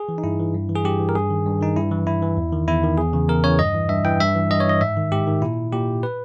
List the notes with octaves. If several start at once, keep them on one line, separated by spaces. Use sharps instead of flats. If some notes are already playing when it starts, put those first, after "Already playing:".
Already playing: G#4
E3
D#4
G2 E4
E3
G2
E3
G#4
G2 G4
E3
A#4
G2 G#4
D#3
G2
D#3 D#4
G2 E4
E3
G2 E4
E3
E2
D#3
E2 E4
D#3
E2 G#4
C#3 E3
E2 A#4
C#3 E3 C#5
G2 D#5
E3
G2 E5
E3 G5
G2 E5
E3
G2 D#5
C#5
E3 D#5
G#2 E5
D#3
G#2 G4
D#3
A#2 E4
A#2 G4
B4